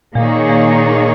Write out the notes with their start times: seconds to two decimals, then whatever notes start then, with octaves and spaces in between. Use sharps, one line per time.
0.15 A#2 D#3 A#3 D#4 G#4 C#5
0.49 A#2